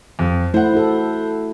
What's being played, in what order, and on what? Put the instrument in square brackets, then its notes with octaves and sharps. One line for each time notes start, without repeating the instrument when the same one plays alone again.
[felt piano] F2
[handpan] A3 E4 [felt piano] C5 F#5
[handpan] E4 F#4 A4